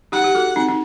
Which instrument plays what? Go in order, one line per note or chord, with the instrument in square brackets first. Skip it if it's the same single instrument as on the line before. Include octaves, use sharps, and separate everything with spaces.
[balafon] D#4 G4 [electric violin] F#5
[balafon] G4
F#4 A4
C4 D#4
D#4